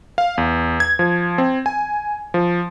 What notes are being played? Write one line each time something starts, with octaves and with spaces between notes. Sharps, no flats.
F5
E2
G#6
F3
C4
G#5
F3